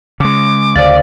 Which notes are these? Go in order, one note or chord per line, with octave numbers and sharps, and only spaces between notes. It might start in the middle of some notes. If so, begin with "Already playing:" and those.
C#3 G#3 D6
D2 C#3 C5 D5 F5